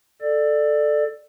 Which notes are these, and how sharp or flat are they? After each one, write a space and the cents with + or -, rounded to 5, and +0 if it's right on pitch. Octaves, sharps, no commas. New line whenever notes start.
A4 +0 D5 +20